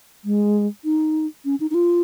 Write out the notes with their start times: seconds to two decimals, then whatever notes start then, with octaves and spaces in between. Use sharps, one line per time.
0.24 G#3
0.84 D#4
1.45 C#4
1.60 D#4
1.71 D#4
1.74 F4